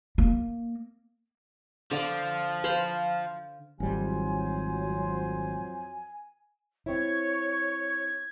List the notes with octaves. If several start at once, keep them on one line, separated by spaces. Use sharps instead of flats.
A#3
D3 F3 D6
C5 F5 B5
G#1 F2 F#3 G3 C5 G#5
C4 E4 C#5 G#6